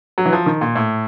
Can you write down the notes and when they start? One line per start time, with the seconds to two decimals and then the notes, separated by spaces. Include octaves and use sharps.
0.18 F#3
0.26 E3
0.33 F3
0.46 D#3
0.61 A#2
0.75 A2